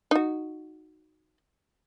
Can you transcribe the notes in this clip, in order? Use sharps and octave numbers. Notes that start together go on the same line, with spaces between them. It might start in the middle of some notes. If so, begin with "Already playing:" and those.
D#4 F#4